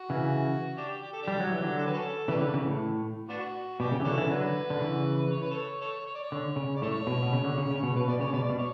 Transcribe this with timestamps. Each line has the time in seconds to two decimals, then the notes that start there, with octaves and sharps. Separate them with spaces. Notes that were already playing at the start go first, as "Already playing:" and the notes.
Already playing: F#4
0.10 C#3 E3
0.77 D4 G4
1.02 G4
1.13 A4
1.23 G3 D4 G4
1.40 F#3
1.52 E3
1.63 D3 F#3
1.78 A4
1.86 B4
1.93 C#4 F#4 A4
2.28 C#3 E3 D4 G4 B4
2.41 D3
2.54 C#3 E3
2.67 A2
3.29 B3 D4 F#4
3.79 B2 D4 G4
3.92 C#3
4.00 E3
4.05 D3 C#4 F#4 A4
4.17 C#3 E3
4.30 D3 F#3 B4
4.70 D3
4.80 C#3 E3
5.31 C#5
5.41 B4
5.51 A4 C#5
5.81 A4 C#5
6.07 C#5
6.15 D5
6.23 C#5
6.32 D3
6.56 C#3
6.76 D5
6.82 A2 A4 C#5
7.07 B2
7.22 B2
7.33 C#3
7.44 D3
7.58 C#3
7.71 C#3
7.83 B2 C#5
7.96 B2 B4
8.08 B2 D5
8.20 C#3 C#5
8.33 B2 D5
8.50 B2
8.58 C#5